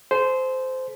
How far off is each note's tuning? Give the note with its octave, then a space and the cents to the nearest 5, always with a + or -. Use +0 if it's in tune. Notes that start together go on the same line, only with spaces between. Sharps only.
A4 -45 C5 -10